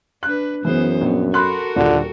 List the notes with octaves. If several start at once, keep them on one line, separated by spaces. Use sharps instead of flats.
D4 B4 F#6
F#2 E3 B3 G#4 C5
A#1 B3
F#4 A4 A#4 B5 C6 F#6
D#1 D3 F4